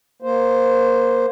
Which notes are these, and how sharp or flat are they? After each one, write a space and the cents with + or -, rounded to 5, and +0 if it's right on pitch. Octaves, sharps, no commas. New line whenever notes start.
A#3 +15 C5 +0